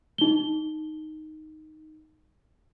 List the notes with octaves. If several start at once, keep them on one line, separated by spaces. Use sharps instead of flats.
D#4 G7